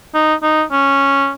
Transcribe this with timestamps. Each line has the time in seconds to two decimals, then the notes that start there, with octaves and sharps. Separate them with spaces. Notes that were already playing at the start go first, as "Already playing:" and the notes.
0.14 D#4
0.43 D#4
0.72 C#4